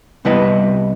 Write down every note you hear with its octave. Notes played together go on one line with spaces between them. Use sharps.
C2 G3 B3 E4 B4 D#5